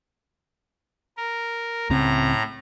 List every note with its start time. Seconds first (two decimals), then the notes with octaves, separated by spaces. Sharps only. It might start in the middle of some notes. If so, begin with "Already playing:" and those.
1.17 A#4
1.90 C#2 A2 C#3 C4 A#5